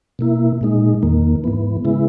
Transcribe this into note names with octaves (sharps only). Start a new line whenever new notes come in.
B2 A#3 E4
A#2 G#3 D#4
E2 D#3 A#3
G#2 E3 B3
C#3 G#3 B3 E4